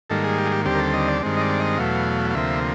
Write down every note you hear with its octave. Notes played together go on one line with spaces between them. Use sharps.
G#2 D#3 G3 A#3 A4
G#4
G4
G#4
G4
D#2 D3 G3 C4 G4
A#4
A4
D#5
D5
G2 D#3 G#3 C4
D#5
D5
D#5
E2 B2 F#3 A3 F5
F5
D2 C3 F3 A#3 E5